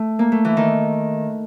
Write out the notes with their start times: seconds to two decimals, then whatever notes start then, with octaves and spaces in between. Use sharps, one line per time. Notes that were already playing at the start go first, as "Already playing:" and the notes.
Already playing: A3
0.19 A#3
0.32 A3
0.45 E3
0.57 D#3